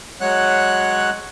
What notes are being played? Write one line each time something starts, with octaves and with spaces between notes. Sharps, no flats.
F#3 G#3 C#5 F#5 F#6